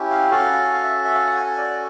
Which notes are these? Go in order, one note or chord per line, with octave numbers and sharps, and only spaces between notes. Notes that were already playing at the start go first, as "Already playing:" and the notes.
Already playing: C#4 E4 G4
F5
C#4 F#4 A4 F5
F5
F5
E5
E5
F5
F#5
G#5
G#5
D5